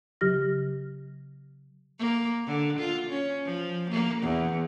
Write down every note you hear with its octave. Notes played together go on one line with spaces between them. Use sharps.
C#3 F#3 G4 F6 A#6
A#3
D3
F4
C#4
F3
A#3
E2